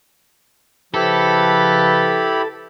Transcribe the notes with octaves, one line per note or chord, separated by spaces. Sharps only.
C#3 F3 E4 G4 A4 B4 B5